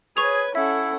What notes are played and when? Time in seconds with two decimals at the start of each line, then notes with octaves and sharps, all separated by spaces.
0.17 G#4 B4 C#5 C#6 G#6 F7
0.55 C#4 E4 A4 E5 F#5